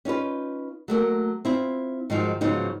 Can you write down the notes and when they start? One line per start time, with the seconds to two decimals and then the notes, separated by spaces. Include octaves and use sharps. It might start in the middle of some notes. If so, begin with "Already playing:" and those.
0.05 C#4 D#4 F4 B4
0.88 F#3 A3 A#3 A#4
1.45 C4 E4 F4
2.10 G#2 D#3 F3 F#3
2.41 G#2 C#3 F3 F#3 B3 D#4